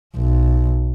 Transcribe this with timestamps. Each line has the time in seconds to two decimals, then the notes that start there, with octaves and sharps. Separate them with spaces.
0.16 B1